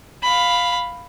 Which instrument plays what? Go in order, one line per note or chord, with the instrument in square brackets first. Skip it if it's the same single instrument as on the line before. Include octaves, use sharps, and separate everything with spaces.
[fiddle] F5 B5